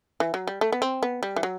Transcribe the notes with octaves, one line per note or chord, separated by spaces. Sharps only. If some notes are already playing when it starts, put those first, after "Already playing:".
E3
F#3
G3
A3
B3
C4
B3
G3
E3
F#3